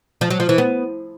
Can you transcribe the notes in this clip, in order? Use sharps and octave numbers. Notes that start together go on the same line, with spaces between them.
F3
F#3
F3
E3
B3